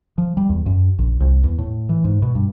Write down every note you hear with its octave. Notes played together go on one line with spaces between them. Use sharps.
F3
G3
E2
F#2
A#1
C2
E2
A2
E3
G#2
B2
G2